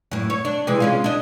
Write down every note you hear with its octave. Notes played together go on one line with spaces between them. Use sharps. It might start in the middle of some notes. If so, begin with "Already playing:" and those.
F#2 A2
C#5
D4
C3 E3 G#3
G#3 C#4 F4
D4 D#5